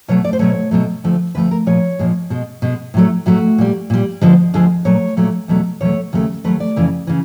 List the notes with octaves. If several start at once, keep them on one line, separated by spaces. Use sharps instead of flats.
B2 F#3 A3 C#5
D5
C5
B2 F#3 A3 C#5
B2 F#3 A3
D2 D3 F3 A3
D2 D3 F3 A3 B4
A#4
A#2 F3 G#3 C#5
A#2 F3 G#3
B2 G#3
B2 G#3
A2 F#3 A3
A2 F#3 A3 F#4
A#2 G3
A#2 G3
D2 D3 F3 G#3
D2 D3 F3 G#3 G#4
A#2 F#3 A3 C#5
A#2 F#3 A3
E2 B2 F#3 A3
E2 B2 F#3 A3 C#5
D#2 C#3 F#3 A3
D#2 C#3 F#3 A3 B4
D5
F2 C#3 E3
C#3 E3